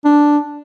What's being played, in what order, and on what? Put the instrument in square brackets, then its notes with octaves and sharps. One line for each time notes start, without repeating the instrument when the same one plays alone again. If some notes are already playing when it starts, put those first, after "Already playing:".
[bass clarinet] D4